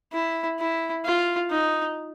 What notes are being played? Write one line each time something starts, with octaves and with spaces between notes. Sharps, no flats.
E4
E4
F4
D#4